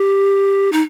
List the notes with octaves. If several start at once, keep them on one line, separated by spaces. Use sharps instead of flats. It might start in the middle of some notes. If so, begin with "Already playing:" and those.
Already playing: G4
D#4